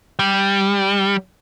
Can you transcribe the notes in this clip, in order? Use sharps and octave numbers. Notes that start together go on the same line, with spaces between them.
G3